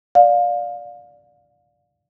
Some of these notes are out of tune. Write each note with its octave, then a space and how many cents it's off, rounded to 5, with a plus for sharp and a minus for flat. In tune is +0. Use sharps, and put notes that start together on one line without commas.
D5 +0 F5 +20